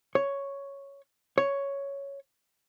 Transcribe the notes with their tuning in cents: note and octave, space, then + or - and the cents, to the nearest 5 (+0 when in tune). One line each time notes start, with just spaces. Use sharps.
C#5 +0
C#5 +5